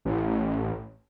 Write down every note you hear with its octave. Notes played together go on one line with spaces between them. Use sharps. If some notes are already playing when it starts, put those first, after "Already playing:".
A1